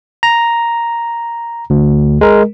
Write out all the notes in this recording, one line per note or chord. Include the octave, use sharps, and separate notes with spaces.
A#5
D2
G#3 A#4